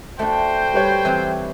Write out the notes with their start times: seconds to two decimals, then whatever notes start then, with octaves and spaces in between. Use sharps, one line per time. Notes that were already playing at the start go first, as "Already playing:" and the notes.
0.19 A3 D4 F#4 C5 G5
0.73 G3 B4 C#5
1.05 E3 C4 G4